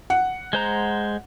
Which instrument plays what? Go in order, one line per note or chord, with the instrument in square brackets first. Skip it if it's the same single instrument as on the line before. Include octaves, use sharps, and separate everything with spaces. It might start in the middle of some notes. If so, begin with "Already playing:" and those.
[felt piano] F#5
[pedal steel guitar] G#3 C5 A#5